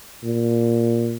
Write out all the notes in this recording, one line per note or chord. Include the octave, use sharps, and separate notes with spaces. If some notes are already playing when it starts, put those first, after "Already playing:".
A#2